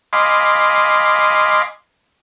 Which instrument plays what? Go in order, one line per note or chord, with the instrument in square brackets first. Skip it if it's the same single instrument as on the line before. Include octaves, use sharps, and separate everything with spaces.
[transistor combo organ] D#5 F5 G#5 B5 C6 D6